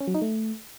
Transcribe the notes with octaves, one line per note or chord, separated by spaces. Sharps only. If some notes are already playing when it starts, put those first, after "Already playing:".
C#4
F#3
D#4
A3